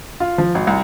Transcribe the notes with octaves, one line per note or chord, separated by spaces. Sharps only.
F4
F3
G#1
C2